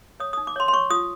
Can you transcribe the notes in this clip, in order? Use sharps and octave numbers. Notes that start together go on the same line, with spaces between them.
C#5 D#6
D#4 D#6
D6
C#5 C6
C6
C#5 C#6
F4 D#6